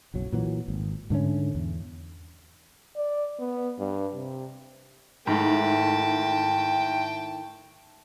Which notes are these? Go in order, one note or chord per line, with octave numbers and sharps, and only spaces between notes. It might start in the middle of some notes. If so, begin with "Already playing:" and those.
F#1 B1 F#3
A#2 E3 F#3
G#1
G#2 D3 A3 C#4
E2
D5
B3
G2
C3
G#2 D#3 A3 E4 G5 A5